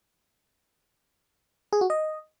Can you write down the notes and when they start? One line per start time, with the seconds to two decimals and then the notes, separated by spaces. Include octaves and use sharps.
1.73 G#4
1.81 F#4
1.90 D#5